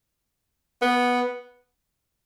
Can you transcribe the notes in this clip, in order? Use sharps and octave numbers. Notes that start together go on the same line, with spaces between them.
B3